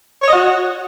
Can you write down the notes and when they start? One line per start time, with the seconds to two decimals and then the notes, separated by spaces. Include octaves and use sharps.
0.22 C#5
0.27 D#5
0.33 F#4